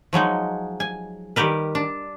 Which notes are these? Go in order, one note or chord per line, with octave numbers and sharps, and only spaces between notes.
F3 F#3 G#3 D#4
G#5
D#3 G3 G4 A#4 B4
D4